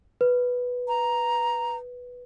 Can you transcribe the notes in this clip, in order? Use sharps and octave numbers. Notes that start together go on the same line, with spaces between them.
B4
A#5